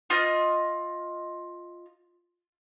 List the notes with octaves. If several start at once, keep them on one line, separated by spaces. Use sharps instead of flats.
F4 D#5 F6